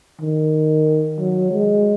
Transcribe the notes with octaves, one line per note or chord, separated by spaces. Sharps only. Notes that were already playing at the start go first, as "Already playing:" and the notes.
D#3
F#3
G#3